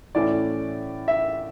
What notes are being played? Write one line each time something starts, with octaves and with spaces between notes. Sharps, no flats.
A2 E3 A3 C#4 D5
E5